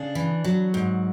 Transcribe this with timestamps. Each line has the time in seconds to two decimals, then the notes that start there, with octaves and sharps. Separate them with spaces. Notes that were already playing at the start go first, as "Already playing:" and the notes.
Already playing: C#3 D4
0.15 E3
0.44 F#3
0.74 G#2